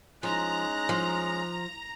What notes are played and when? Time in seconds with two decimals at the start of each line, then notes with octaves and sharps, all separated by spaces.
0.23 F3 G#3 C#4 D#4 A#5 F#6
0.89 F3